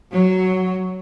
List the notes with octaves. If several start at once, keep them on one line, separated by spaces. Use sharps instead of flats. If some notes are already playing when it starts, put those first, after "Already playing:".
F#3